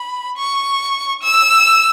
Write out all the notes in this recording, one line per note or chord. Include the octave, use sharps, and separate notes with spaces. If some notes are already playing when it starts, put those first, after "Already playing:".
Already playing: B5
C#6
E6